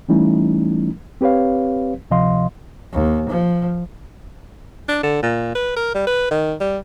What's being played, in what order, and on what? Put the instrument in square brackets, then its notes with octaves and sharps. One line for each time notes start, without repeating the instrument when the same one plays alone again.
[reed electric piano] E3 G3 A3 C#4 D#4 E4
C4 G4 B4 C#5 F5
D2 C3 F3 D#5 F5 C6
[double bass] D#2
F3
[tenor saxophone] D4
D3
A#2
B4
A#4
G3
B4
D#3
G3